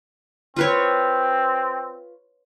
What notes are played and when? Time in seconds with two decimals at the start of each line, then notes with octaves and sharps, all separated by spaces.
0.56 C4 F4 B4 C#5